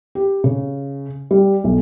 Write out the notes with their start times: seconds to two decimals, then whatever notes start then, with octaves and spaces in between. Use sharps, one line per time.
0.15 G4
0.44 C#3
1.31 G3
1.64 B1